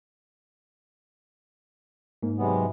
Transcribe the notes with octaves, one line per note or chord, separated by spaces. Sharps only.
G#2 A#3
C3 F#3 G#3 B3